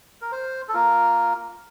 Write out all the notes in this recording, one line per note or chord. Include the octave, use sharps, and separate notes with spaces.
A#4
C5
A4
A#3 F4 A#4